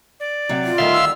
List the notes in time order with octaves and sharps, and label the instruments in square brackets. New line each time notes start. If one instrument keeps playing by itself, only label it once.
[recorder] D5
[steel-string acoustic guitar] C3 F#3
[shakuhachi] F4
[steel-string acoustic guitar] D2 D#3 G3 [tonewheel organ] E5 F5 C6
[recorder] E6